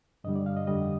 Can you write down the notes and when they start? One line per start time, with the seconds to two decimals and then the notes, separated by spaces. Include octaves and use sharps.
0.24 G2 D3 G3 D#5
0.36 D5
0.46 F5
0.57 D#5
0.67 F2 D3 G3 D#5